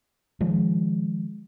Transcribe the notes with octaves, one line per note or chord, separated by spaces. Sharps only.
D#3 F3 G#3